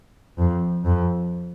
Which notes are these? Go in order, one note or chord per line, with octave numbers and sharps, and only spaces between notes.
F2
F2